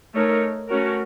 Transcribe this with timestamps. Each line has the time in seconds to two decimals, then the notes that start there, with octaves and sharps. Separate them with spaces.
0.14 A3 D#4 A#4 C#5
0.69 A3 C#4 F#4 A#4